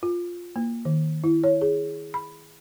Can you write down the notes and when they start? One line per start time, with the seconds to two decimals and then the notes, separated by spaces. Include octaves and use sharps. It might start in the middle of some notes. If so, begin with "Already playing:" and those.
0.03 F4
0.56 A#3
0.85 D#3
1.24 E4
1.44 C#5
1.61 G#4
2.14 B5